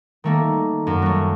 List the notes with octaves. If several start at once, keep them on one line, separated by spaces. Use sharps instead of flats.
D#3 A3 A#3
F#2
F#3 A3